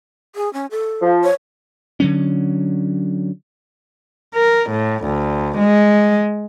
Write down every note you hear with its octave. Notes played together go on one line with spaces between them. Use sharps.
G#4
C#4
A4
F3
C#5
D3 F#3 C#4
A#4
A2
D2
G#3